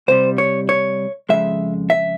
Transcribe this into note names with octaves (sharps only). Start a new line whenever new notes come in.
C2 C3 G3 C5
C#5
C#5
F2 C#3 F3 G#3 E5
E5